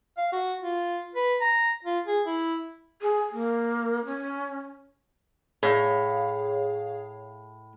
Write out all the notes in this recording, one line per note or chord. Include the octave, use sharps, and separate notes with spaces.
F5
F#4
F4
B4
A#5
F4
G#4
E4
G#4
A#3
C#4
A2 G#4 C#5 F5